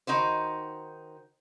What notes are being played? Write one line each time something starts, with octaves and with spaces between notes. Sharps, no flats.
D#3 D#4 F#4 C5